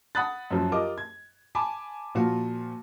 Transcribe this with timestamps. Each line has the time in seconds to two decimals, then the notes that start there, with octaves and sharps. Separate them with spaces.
0.15 F#5 B5 D#6 F#6 A6
0.51 F#2 F3
0.72 F4 G4 A#4 D#5 D6
0.98 G#6
1.55 G#5 A5 B5 D6
2.15 A#2 F3 F4 F#4